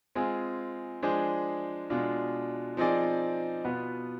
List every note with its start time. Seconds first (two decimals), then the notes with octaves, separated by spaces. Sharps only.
0.15 G#3 C4 F4 G#4
1.02 F3 G#3 D4 G#4 C5
1.90 B2 G#3 D4 F4
2.77 F3 C4 D#4 G#4 D5
3.65 B2 B3 F4 B4